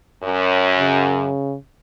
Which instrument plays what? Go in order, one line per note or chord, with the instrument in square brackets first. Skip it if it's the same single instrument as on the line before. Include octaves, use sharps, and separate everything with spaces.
[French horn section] F#2
[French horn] C#3